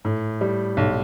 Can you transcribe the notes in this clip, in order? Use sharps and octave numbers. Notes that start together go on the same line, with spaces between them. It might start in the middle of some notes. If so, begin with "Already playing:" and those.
A2
G3
B1